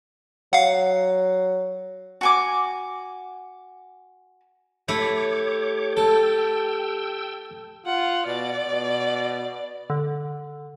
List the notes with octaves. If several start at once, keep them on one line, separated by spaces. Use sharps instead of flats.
F#3 F5 F#5
F#4 G#5 D6
A3 E4 G4 C#5 B5 D6
A4 G5 E6
F4 F#5
B2 D5
B2
D3